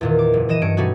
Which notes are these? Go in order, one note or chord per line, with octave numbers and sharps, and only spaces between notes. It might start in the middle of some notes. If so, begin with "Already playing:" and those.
E2 A#2 D#3
D6
F#1
E3 D#5 D#7 E7
G2 C#4 C#7 D7
B2 G3 A3 C#4 D#4 F#4